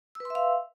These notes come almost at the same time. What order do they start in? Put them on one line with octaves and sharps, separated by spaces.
E6 B4 C6 E5 F5